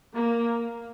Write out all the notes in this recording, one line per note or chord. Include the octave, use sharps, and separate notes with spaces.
A#3